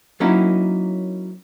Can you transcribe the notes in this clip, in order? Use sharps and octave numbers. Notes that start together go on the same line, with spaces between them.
F#3 A#3 C#4 D#4 E4 A#4